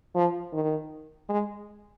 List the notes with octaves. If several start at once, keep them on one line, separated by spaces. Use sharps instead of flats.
F3
D#3
G#3